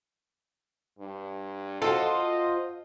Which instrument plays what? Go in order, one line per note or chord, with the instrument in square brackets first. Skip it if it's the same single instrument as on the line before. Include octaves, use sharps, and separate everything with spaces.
[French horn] G2
[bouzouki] F4 C5 [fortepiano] F#4 A4 [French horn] D#5